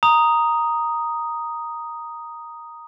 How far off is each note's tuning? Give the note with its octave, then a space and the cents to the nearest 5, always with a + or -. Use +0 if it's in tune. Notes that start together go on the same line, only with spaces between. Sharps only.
A#5 +0 D#6 +0